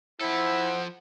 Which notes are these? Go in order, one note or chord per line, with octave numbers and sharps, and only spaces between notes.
F3 E4 A4 C5 F#5